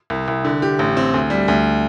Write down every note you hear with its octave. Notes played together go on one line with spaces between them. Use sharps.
C2
C2
D3
G4
A1
C4
D2
G3
D2